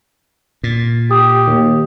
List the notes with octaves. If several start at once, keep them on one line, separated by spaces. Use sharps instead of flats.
A#2
G4 D#6
D#2